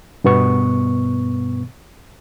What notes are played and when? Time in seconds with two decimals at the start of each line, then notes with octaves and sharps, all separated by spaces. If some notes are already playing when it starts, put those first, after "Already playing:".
0.24 G2 B2 B3 C#6